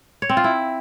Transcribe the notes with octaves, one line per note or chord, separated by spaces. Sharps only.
C#5
C4
F4
E4